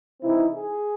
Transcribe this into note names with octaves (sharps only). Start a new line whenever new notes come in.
C3 E3 C4 D#4 E4
G#4